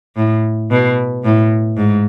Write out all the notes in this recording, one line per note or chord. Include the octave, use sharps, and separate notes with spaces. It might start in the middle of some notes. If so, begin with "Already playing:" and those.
A2
B2
A2
G#2